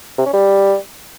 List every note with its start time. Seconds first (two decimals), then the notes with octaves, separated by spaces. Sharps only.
0.18 C3
0.26 C#4
0.34 G3